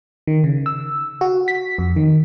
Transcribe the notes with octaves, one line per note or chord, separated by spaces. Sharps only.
D#3
C#3
E6
F#4
B6
F2
D#3